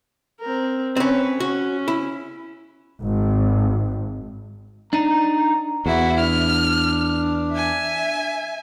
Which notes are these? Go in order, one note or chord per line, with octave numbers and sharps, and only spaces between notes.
C4 A#4
C4 C#4 B4 C#5
C#4 F#4
E4
G#1
D4 D#4 A#5
E2 E4 F#4
D4 F6
E5 G#5